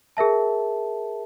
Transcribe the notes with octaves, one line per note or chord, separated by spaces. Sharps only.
G#4 A#4 E5 A5